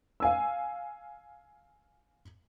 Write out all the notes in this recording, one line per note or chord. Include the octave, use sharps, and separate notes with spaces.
F5 G#5 E6